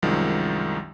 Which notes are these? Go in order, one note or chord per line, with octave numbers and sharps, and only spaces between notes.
C2 F#2 D#3 F3 G#3